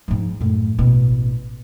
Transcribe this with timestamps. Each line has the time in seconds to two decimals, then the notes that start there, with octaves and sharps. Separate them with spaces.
0.08 G#2 F3
0.41 F#2 A2
0.78 A1 B2